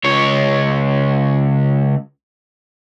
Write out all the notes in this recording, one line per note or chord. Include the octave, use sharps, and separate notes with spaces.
C#2 C#5